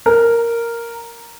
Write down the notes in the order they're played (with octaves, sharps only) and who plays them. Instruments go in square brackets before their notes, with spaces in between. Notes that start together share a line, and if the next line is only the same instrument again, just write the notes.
[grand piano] A#4